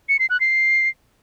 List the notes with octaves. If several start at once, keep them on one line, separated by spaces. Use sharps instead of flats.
C#7
C7
F#6
C7